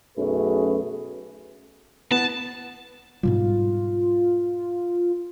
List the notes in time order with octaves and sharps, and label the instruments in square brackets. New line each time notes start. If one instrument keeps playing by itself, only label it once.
[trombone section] B1 F#2 A3 C#4 G#4 B4
[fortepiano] B3 [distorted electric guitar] A5
[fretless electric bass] G#2 B2 G3 [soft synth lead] F4